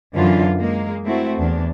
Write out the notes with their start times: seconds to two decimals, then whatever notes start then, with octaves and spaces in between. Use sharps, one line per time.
0.16 F#2 D3 E3 F#3 F4
0.59 G#3 A#3
1.05 A3 C4 E4 F#4
1.39 E2 D4